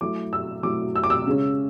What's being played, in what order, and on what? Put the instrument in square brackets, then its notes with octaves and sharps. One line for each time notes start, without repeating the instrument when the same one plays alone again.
[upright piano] F#3 A3 E4 D6
E6
F#3 A3 E4 D6
E6
D6
E6
C#3 G#3 C#4